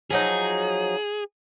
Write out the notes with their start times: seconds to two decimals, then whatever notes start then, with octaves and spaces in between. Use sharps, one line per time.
0.11 F3 F#3 D#4 G#4